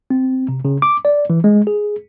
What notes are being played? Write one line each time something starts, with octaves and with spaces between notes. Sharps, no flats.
C4
C3
C#3
D6
D5
E3
G#3
G#4